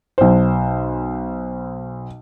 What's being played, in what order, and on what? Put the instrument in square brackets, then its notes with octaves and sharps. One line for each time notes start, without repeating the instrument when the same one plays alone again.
[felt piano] B1 C5